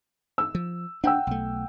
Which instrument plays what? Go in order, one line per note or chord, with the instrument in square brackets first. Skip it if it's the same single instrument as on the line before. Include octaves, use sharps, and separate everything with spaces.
[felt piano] E6
[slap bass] F3
[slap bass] D4 [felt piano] F#5 G5 E6
[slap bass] B1 A3